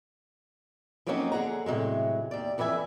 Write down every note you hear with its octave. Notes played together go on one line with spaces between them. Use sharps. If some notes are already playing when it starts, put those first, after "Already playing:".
F3 F#3 A#3 C4 C#4 D#4
D3 G#4 F#5 A#5
A2 C3 D#3 F#3 G#3
D#2 D5
F2 E3 B4 E5 G#5